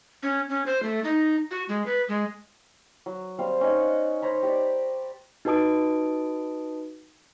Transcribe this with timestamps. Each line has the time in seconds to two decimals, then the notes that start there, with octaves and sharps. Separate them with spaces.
0.23 C#4
0.49 C#4
0.66 C5
0.83 A3
1.04 D#4
1.51 F#4
1.69 G#3
1.86 B4
2.09 G#3
3.06 F#3
3.39 G3 C4 F5
3.61 C#4 D#4 C#6
3.80 F#5
4.22 C5 C#5 A#5 B5
4.43 G4 D5
5.45 D#4 F#4 B4 A5 D#6 D7